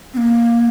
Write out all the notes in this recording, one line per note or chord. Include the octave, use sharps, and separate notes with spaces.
C4
A#3